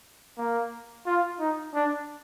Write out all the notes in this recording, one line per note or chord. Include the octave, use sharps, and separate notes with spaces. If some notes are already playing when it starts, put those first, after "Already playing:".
A#3
F4
D#4
D4